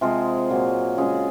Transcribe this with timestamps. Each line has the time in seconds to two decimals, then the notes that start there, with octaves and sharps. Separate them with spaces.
0.01 C3 F3 G#3 F4 G#4
0.50 A#2 F#3
0.98 C#3 G#3 F4 G#4